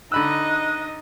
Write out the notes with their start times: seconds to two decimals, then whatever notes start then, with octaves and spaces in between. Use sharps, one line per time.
0.12 D3 D#4 D#5 B5 E6 F#6